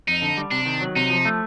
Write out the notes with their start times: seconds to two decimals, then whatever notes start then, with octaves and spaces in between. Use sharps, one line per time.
0.08 F2 D#4
0.22 D3
0.37 G3
0.51 C3 D4
0.66 D#3
0.81 F#3
0.96 C3 D#4
1.10 F3
1.25 A3